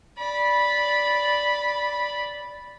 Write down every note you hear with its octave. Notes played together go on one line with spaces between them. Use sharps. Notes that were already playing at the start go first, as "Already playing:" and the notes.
D5 B5